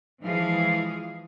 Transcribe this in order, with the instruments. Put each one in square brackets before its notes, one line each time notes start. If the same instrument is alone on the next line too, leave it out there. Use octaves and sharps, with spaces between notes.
[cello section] E3 F3 G#3 G#4 F5